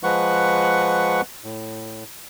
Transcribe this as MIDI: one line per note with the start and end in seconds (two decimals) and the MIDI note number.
0.03 1.21 53
0.03 1.21 56
0.03 1.21 71
0.03 1.21 78
0.03 1.21 85
1.44 2.04 45